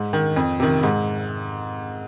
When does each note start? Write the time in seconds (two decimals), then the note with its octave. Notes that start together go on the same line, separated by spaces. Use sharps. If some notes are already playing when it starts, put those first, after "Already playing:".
Already playing: G#2
0.13 D#3
0.36 F2
0.60 C3 D#3
0.83 G#2